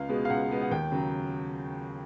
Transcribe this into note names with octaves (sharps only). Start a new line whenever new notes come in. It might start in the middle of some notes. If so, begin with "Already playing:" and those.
Already playing: C#2 F5
B2 G#3 B3
F5
C#2 F#5
B2 G#3 B3
F#5
D#2 G5
C#3 F#3